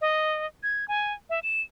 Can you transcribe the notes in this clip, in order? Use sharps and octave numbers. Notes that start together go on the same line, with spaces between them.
D#5
G#6
G#5
E5
E7